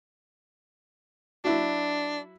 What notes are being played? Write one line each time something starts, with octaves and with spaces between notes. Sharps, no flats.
F#3 D4 E4 F#4